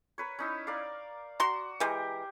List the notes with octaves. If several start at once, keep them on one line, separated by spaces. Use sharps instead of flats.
A#4 B4 C#5
C#4 D#4 E4
A#4 D5 F5
F#4 A#5 C6
E3 G#3 G4 A#4 C5